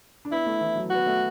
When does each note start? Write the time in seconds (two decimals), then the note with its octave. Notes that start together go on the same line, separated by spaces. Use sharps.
0.25 D4
0.32 B3 E4
0.46 A3
0.61 E3
0.76 F#3
0.90 B3 F#4
1.07 A3